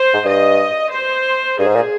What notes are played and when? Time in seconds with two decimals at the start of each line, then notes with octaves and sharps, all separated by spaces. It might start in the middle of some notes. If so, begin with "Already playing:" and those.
Already playing: C5
0.14 G#2
0.25 G2 D#5
0.92 C5
1.59 G2 G#4
1.67 G#2
1.76 A#2